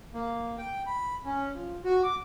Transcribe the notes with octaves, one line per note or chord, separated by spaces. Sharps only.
A#3
G5
B5
C#4
F3
F#4
D6